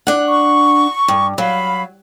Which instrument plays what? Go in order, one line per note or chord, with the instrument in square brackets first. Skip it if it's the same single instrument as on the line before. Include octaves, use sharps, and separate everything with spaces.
[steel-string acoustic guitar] D4 F#5
[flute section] C#6
[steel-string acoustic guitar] G2
[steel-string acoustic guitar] F#3 [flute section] F5 B5